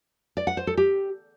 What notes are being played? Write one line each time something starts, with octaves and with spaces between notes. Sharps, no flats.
D5
F#5
C5
A4
G4